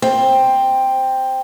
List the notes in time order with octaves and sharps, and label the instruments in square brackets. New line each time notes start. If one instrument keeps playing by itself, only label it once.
[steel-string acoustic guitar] C4